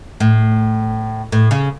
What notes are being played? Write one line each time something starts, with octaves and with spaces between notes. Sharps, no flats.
A2
A2
C#3